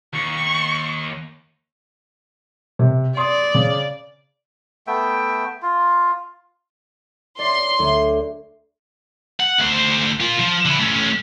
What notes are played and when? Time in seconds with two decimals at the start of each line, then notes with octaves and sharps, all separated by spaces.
0.14 D#2 C#6
2.79 C3
3.17 D5 C6 D#6
3.55 C#3
4.87 A3 B3 E5 G5
5.62 F4
7.39 C#5 D5 C6
7.79 D2 C#5
9.40 F#5
9.58 D2 C5
10.20 F4 A#4
10.39 F3
10.65 D3 E4
10.80 A3 C#4